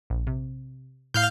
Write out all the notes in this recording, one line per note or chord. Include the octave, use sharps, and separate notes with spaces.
A#1
C3
A2 F5 F6 G6